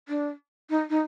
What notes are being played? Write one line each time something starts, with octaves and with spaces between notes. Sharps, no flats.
D4
D#4
D#4